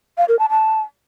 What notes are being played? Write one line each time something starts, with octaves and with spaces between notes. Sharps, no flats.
F5
A#4
A5
A5